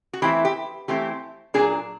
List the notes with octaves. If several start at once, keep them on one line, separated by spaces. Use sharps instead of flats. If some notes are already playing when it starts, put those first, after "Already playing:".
F#4
E3 A3 C4 E4 G4
G4
E3 A3 C4 E4 G4
A#2 F#3 A#3 D4 G#4